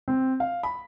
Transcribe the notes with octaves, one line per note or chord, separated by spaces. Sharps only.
C4
F5
B5